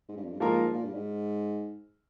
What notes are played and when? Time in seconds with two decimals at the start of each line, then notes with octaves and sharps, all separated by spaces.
0.09 G#2
0.17 G2
0.24 F2
0.33 G2
0.40 G#2 F3 A#3 F4 A#4
0.64 G#2
0.74 A#2
0.84 G2
0.94 G#2